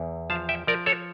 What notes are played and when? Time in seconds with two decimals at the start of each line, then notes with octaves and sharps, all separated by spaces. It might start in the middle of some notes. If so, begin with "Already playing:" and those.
Already playing: E2
0.30 F3 F5 A5
0.49 E5 G5
0.67 F3 A#4 D5
0.86 A4 C#5